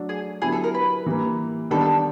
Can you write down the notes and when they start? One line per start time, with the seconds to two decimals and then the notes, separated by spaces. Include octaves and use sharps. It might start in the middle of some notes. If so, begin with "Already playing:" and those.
Already playing: F#3 A3 D4 F#4 A4
0.09 G#4
0.42 D3 F#3 B3 E4 G4 G#4
0.52 A4
0.64 A#4
0.74 B4
1.06 E3 G3 A#3
1.71 D#3 G3 B3 D4 A4
1.81 A4